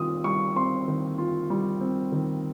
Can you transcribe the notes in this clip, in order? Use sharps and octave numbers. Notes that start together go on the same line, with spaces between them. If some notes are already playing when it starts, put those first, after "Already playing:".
Already playing: D#3 G3 C4 F4 D#6
G3 C#6
C4 C6
D#3
F4
G3
C4
D#3